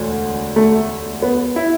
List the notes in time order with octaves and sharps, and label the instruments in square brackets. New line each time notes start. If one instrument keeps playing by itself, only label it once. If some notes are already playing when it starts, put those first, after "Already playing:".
Already playing: [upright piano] E1 D2 D3
A3
B3
E4